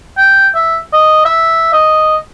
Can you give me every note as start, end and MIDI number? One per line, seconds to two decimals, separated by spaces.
0.17 0.49 79
0.55 0.79 76
0.93 1.22 75
1.25 1.69 76
1.73 2.17 75